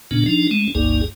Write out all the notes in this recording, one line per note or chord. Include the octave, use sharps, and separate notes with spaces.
A#2 C#3 B3 D4
F3 D4 D#4
G#3 A3 C#4
G1 C#2 G2 A#3 D#4 G#4